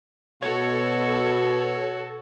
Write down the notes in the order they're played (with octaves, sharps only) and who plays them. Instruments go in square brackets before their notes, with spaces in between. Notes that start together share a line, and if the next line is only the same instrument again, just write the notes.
[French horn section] B2 [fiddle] F#4 [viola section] A4 [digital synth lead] C#5